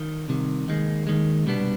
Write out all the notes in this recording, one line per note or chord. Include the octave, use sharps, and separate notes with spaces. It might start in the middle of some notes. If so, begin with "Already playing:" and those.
Already playing: D#3
C2 C3 D#3
D#2 D#3 G#3
D#2 D#3 G#3
C2 B2 G3 B3 D4